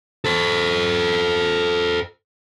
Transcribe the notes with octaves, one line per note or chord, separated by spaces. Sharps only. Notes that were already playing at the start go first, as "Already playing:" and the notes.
A4 C5